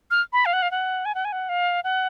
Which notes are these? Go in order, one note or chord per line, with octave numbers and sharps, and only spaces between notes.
F6
B5
F5
F#5
F5
F#5
G#5
F#5
G#5
F#5
F5
F#5